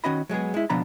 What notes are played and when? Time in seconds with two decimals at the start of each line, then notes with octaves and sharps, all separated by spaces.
0.04 D#3 C#4 F#4 D#5 B5
0.29 F#3 G#3 B3 G#4
0.54 G#3 E4
0.70 C#2 B2 F3 D4 A#5 B5